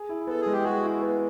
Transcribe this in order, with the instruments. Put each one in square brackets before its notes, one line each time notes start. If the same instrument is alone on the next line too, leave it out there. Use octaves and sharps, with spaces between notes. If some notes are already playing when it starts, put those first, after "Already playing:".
Already playing: [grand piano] G#4
E4
[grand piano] B3 [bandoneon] A4
[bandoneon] G#4
[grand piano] G#3
[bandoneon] G4
[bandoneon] F#4 [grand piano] G#4
[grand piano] E4
B3